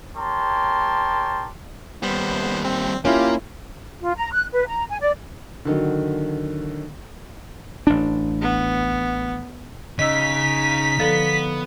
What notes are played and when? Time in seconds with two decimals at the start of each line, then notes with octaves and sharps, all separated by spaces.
0.16 G4 A#4 C#5 G5 A5 C6
2.03 D#2 G3 B3 C5
2.64 C4
3.05 A#3 C#4 E4 F4 G4
4.01 F4
4.17 A#5
4.32 F#6
4.52 B4
4.67 A#5
4.89 G#5
5.01 D5
5.65 D3 D#3 F#3
7.87 A1 D4
8.41 B3
9.99 C#3 D#4 D#5 E6 B6
11.00 D3 F3 B3 A4